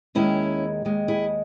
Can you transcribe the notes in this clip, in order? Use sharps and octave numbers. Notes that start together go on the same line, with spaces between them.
D#2 D#3 G#3 C#4 E4
D#2 D#3 G#3
E4 G#4